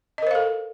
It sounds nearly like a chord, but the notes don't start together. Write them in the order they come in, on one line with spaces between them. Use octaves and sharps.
D#5 A#4 C5 F5 A4